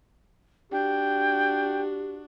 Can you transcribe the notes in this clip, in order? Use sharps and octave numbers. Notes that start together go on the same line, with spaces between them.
D4 F#4 G4 G5